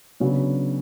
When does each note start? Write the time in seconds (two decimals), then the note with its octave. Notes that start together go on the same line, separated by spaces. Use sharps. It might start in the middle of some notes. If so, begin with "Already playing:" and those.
0.20 C#3 F#3 B3 D4